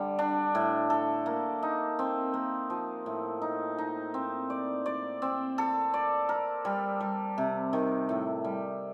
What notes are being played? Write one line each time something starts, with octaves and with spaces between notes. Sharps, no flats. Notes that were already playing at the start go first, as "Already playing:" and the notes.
Already playing: D3 G3
D4
A2
A4
A#3
D#4
C4
A#3
F3
A2
D#4
D#4
C4
D5
D5
C4
A4
D5
A#4
G3
G3
C3
D#3
A2
G3